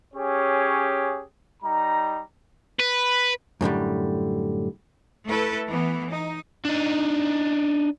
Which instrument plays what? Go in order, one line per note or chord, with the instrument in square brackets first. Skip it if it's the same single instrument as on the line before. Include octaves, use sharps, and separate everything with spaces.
[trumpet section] C#4 G4 G#4 C#5
G3 D#4 A#5
[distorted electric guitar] B4
[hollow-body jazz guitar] F#2 A2 D3 G3
[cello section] A3 E4 A4 B4
E3 B3
D#4
[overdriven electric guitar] D4 D#4